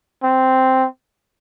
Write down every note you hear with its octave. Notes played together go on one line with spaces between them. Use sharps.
C4